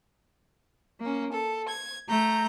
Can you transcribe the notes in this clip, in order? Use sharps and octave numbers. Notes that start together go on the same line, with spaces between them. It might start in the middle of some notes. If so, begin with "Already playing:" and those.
A#3 C#4
A4
G#6
A3 A#5 G6